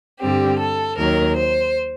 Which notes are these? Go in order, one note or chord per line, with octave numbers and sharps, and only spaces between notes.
G2 D3 G3 C4 G4
A4
D#2 D#3 F#3 A#4
C5